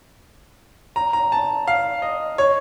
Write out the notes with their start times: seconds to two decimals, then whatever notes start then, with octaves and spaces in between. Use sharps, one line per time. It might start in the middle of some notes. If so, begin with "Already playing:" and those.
0.96 A#5
1.13 A#5
1.32 A5
1.68 F5
2.02 D#5
2.38 C#5